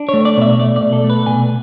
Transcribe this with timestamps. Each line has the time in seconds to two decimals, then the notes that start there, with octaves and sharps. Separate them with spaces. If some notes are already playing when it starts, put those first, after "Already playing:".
Already playing: D4
0.09 A3 C#5
0.25 D5
0.37 B2 E5
0.59 A3 D5
0.76 D5
0.81 B2
0.93 A4
1.04 A3
1.10 B4
1.26 B2 G#5